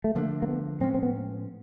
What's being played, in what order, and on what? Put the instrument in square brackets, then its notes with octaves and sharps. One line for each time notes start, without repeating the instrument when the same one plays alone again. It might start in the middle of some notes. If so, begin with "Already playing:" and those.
[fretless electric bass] A3
[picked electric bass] D3 F3 A3 D4 [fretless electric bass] A#3
[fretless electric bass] A#3
B3
[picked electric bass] A2 F3 G#3 C#4 [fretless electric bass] C4
[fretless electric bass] C4
B3